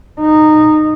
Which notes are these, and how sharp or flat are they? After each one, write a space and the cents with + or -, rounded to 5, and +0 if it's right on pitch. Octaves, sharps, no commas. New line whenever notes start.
D#4 -15